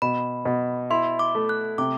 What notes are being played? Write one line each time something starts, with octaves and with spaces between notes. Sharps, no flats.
B2 B5
B2
E4 C6
D6
A3
F#6
C3 D6